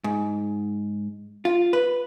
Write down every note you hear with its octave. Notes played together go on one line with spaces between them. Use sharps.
G#2
F4
B4